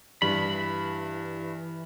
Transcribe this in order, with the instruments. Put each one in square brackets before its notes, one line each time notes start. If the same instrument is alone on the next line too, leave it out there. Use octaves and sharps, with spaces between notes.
[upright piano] G2 [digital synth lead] E3 [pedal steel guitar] B5